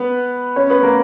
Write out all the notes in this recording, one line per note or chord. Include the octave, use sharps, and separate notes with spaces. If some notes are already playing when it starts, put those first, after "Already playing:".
Already playing: B3 B4
C#4 C#5
B3 B4
A#3 A#4